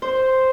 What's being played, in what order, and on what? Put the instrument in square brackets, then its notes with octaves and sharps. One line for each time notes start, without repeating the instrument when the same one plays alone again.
[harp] C5